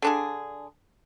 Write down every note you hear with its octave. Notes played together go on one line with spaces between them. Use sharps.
D3 D4 G#4